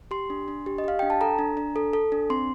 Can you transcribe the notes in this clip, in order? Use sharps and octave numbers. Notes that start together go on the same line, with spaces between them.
G4 C6
D4
D4
G4
D#5
G4 F5
D4 G5
A5
A4 A#5
D4
D4
A4
A4
D4
C4 C6